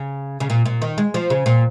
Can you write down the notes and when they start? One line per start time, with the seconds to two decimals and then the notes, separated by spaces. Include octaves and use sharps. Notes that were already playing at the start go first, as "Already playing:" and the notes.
Already playing: C#3
0.40 C#3
0.50 A#2
0.66 A#2
0.82 D#3
0.98 G#3
1.14 F3
1.30 C#3
1.46 A#2